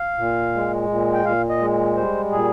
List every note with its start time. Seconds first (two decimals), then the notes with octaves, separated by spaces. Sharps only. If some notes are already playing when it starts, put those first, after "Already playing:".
Already playing: F5
0.18 A#2
0.55 G#3
0.90 A#2
1.14 G5
1.26 A#2 F5
1.49 D#5
1.61 G#3
1.96 G3 C5
2.32 A#2 G#4